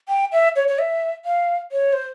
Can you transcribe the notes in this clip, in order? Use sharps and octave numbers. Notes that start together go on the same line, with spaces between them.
G5
E5
C#5
C#5
E5
F5
C#5
C5